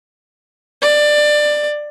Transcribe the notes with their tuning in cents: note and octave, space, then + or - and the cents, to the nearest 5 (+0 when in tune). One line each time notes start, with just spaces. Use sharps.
D5 +20